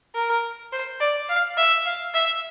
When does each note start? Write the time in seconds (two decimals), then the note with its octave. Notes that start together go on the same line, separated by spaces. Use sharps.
0.15 A#4
0.73 C5
1.00 D5
1.29 F5
1.57 E5
1.86 F5
2.14 E5